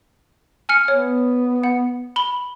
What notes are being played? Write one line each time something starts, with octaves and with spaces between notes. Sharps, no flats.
G#5 F6 C#7
B3 C#5
F#5
B5 F#7 G7